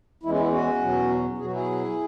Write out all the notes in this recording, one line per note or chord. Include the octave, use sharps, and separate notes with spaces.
E2 E3 G#3 E4
C#4
B3 E4
C#4 F#4
E2 B2 F#3
B2 F#3 F#4 G#4
E4 G#4